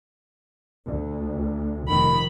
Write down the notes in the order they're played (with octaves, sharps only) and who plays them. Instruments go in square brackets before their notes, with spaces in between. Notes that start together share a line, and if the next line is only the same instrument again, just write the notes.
[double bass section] D2
[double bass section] F1 D#3 [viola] B5